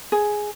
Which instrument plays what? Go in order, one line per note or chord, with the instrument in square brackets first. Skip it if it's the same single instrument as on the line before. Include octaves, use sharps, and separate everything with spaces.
[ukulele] G#4